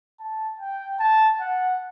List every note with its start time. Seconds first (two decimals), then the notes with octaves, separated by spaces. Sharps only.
0.20 A5
0.60 G5
1.00 A5
1.40 F#5